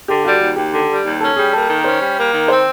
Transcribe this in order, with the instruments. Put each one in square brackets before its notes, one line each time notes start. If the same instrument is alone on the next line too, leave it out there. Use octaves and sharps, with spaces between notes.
[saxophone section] D3 [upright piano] G4
[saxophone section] G3 [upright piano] F#4
[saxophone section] D#2
[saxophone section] D#2 [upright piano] G4
[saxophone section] D3
G3
D#2
[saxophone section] C#4 [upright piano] A4
[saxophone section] G3 [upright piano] G#4
[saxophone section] A#3 [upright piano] A4
[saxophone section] D#3
[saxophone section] C#4 [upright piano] C5
[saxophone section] G3
A#3
D#3
[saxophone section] C4 [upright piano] C5